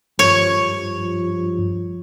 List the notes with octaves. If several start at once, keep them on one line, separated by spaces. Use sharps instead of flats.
G2 F3 C#5